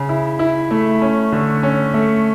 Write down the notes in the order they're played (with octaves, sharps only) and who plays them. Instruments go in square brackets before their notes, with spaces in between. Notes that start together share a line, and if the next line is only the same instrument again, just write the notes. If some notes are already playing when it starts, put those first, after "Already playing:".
Already playing: [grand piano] C#3
E4
E4
A3
C#4
D3
C#4
A3